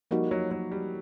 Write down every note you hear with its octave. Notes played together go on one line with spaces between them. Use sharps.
F3 G3 A#3 D#4 F#4
F#3
F#3
G3